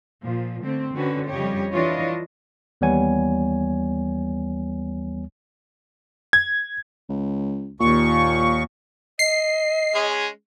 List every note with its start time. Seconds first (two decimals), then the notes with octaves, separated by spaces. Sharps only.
0.22 A#2 F3
0.64 D3 A3 C4
0.95 D3 C4 C#4 F#4 B4
1.29 F2 C#3 G3 G4 C#5 D#5
1.72 E3 D4 E4 F4 C#5 D#5
2.81 D#2 E3 G3 B3 C#5 G#5
6.33 G#6
7.09 C#2
7.80 D#2 A#2 C#6
9.19 D#5 C7
9.95 G#3 C#4 G#4